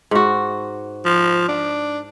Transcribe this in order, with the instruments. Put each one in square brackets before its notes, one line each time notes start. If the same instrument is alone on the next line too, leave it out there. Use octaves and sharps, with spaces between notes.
[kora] G#2 F#4
[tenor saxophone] F3
D4